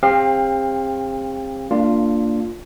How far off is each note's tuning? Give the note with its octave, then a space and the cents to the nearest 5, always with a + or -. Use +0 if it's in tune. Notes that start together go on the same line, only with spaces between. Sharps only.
C4 +25 G4 +45 F5 +0
A#3 -25 D4 +0 F4 +0